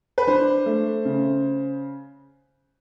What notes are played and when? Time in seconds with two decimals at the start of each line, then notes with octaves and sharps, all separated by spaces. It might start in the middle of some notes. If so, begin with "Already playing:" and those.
0.18 B4
0.27 D4 C5
0.66 A3
1.05 C#3